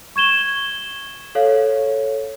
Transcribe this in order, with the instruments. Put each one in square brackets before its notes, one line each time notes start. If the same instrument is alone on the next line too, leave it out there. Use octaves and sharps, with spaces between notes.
[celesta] C#6 G#6 E7 G7
A4 C#5 F5